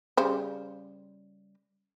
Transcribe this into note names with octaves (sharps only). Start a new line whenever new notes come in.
C#3 G3 C5